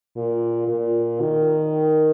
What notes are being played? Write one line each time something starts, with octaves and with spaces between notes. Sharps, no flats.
A#2
A#2
D#3